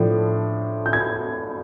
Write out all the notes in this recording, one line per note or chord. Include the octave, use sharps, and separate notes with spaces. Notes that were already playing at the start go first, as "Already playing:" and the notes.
Already playing: A2 F3 A3 D4
G6
G#6